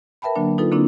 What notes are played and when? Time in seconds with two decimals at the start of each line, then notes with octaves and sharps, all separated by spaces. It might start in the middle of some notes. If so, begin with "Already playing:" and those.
0.22 A#4 B4 E5 G5 A5 B5
0.36 D3 F#3 A#3 D4
0.58 D#4 F4 A4 B4
0.72 D3 A#3 C4 D4 E4